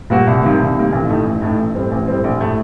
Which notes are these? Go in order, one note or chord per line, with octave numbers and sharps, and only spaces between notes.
A#2 G3 A#3 F#4
C2
C3 D#3 G3 A#3
C2
C3 D#3 G3 A#3
A1
A2 A3 D#4
A1
A2 A3 D#4
A1
A2 G3 C4
A1
A2 G3 C4
A#1
A2 A3